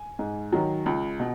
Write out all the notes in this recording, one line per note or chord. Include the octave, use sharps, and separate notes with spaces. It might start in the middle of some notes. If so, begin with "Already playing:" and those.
Already playing: G#5
G#2
D#3 F#3
C#2
B2